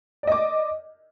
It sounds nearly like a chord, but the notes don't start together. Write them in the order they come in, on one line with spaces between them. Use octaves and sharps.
D5 D#5 D6